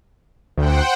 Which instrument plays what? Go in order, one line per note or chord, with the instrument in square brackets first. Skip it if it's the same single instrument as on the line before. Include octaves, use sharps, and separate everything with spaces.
[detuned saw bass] D2 [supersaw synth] C5 F#5 G5